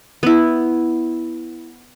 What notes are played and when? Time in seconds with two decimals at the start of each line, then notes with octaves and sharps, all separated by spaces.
0.23 B3 E4